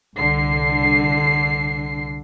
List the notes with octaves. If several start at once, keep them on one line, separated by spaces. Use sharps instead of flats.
C2 D3 C7